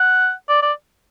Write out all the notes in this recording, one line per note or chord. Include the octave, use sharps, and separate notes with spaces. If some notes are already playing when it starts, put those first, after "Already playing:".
Already playing: F#5
D5
D5